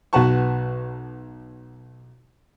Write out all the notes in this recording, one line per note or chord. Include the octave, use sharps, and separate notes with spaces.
B1 F#4 B4 F#5 A5 C#6